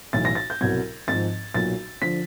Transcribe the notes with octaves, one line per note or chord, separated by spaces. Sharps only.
B1 A2 E3 A6
A#6
A6
G6
C2 B2 F#3 G#6
G#1 G#2 F3 A6
B1 A#2 F#3 A6
D3 F3 B6